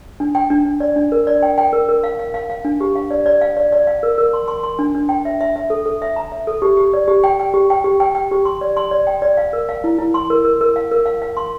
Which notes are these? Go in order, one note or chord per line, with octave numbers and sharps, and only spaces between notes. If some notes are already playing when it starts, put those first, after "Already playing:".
D4
G5
D4
D4
D5
D4
A#4
D5
G5
G5
A#4
A#4
F5
F5
F5
F5
D4
G4
F5
D5
D5
F5
D5
D5
F5
A#4
A#4
C6
C6
C6
D4
D4
G5
E5
E5
E5
A4
A4
E5
A#5
E5
A4
G4
G4
D5
G4
G5
G5
G4
G5
G4
G5
G5
G4
C6
D5
C6
D5
G5
D5
F5
A#4
F5
E4
E4
C6
A#4
A#4
A#4
F5
A#4
F5
F5
C6